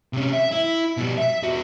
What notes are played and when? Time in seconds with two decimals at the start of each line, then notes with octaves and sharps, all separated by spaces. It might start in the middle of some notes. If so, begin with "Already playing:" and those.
0.13 C3 C#4
0.33 E5
0.52 E4
0.97 B2 G3
1.18 E5
1.43 E2 F#4